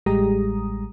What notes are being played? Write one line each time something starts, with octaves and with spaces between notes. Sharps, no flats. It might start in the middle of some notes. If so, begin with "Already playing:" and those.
A1 G3 G#3 G4 A#5 D#6